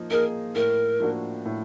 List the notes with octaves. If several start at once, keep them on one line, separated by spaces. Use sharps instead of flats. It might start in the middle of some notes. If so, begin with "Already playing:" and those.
Already playing: F3 A#3 D#4
A#3 D#4 G#4 A#4
A2 A#4
F3 A#3 D4 F#4
A2